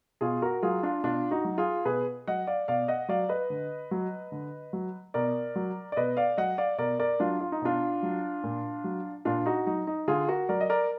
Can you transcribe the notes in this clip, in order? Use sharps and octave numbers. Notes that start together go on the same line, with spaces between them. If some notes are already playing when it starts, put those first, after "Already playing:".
B2 F4 G#4
F#4 A#4
F#3 F4 G#4
D4 F4
B2 D4 F4
D#4 F#4
F#3
F4 G#4
B2 G#4 B4
F#3 D#5 F#5
D5 F5
B2 D5 F5
D#5 F#5
F#3 D5 F5
B4 D#5
D3
F#3
D3
F#3
B2 A#4 D5
F#3
D5
B2 B4 D#5
D5 F5
F#3 D#5 F#5
D5 F5
B2 A#4 D5
A#4 D5
F#3 D4 F4
F4
D#4
B2 D4 F4
F#3
A#2
F#3
A#2 D4 F4
D#4 F#4
F#3 D#4
D#4
D3 F4 G#4
F#4 A#4
F#3 A#4 D5
D#5
A#4 D5